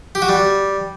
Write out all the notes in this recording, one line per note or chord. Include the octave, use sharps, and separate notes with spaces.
G4
F#4
G3